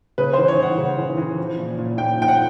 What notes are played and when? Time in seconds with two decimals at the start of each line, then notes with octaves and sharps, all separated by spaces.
0.18 C#3 B4
0.33 C5
0.38 E3
0.48 C#5
0.58 E3 F#5
0.78 C#3
0.98 E3
1.18 E3
1.37 F3
1.58 A#2
1.79 A#2
1.97 A#2 G5
2.18 F3 G5
2.28 F#5